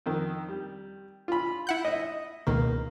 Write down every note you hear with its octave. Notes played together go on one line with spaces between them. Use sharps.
F2 D#3
G3
F4 B5
E4 F#5 G6
D#5 E5
C#2 B2 D#3 A#3